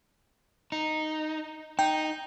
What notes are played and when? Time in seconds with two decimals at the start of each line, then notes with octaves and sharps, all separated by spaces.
0.72 D#4
1.79 D#4 G5